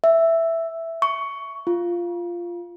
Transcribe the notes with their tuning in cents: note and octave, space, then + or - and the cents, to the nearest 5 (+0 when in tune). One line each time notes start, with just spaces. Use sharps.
E5 +0
C#6 +15
F4 -5